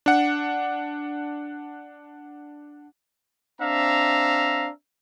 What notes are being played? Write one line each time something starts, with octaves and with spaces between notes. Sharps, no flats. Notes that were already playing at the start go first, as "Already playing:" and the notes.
D4 F#5
C4 D4 E5 F5 A#5